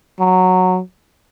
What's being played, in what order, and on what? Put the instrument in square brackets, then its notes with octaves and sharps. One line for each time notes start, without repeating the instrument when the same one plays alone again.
[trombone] F#3